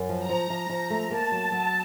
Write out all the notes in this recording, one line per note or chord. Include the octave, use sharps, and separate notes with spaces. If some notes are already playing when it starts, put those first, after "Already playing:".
Already playing: F#2
F3
A#5
F3
F3
F3
A3
A#3 A5
F#3
F#3